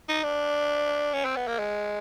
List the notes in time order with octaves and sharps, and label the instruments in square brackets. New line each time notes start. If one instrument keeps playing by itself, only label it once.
[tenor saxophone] D#4
D4
C#4
C4
B3
A#3
G#3